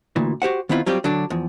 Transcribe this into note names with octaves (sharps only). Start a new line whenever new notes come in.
D2 A#2 E3
F#4 G4 C5 F#5
D#3 B3 C4 E4 F4
F#3 G3 C4 F4 G4
D3 F#3 D4
E2 F3